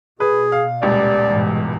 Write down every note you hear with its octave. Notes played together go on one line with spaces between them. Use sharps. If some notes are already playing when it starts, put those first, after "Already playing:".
B2 G#4 B4
F5
D#1 C#2 G3 D5
G#2 B2 E3